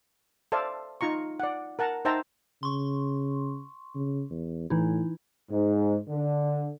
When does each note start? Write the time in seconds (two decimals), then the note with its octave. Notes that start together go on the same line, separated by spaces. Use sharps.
0.52 A4 C5 D5 E5 F5 A5
1.01 D#4 F4 A#5 C#6
1.40 D5 F#5
1.79 A#4 F#5 A5 A#5
2.05 D#4 C5 E5 G5 A5 A#5
2.63 C#3 C6 C#6
3.95 C#3
4.30 E2
4.70 A2 E3 D#4 E4
5.50 G#2
6.08 D3